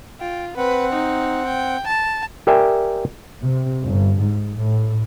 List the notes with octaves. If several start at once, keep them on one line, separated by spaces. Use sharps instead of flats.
F4 G5
C4 B4 F#5
D#4
G5
A5
G4 A#4 D5 E5 G5 G#5
C3
G1
G#2
A2